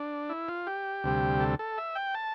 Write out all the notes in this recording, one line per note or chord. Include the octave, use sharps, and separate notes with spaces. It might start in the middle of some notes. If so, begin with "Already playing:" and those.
Already playing: D4
E4
F4
G4
D2 C3 G3
A4
A4
E5
G5
A5